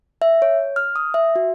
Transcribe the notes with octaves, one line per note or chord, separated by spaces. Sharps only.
E5
C#5
F6
D#6
E5
F#4